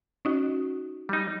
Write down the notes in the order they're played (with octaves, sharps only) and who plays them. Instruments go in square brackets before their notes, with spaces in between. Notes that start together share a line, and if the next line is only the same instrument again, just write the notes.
[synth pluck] C#4 D#4 F#4
[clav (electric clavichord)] G3 D#4